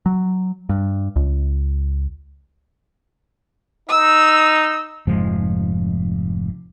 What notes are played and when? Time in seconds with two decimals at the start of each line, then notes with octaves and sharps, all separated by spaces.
0.06 F#3
0.69 G2
1.16 C#2
3.89 D#4 E6
5.07 F1 G#2 F3 G#3